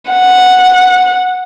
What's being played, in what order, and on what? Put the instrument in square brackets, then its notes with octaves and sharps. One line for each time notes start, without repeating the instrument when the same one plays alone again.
[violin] F#5